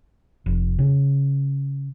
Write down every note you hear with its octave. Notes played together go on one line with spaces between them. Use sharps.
F1
C#3